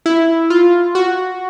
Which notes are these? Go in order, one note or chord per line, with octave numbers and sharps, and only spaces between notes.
E4
F4
F#4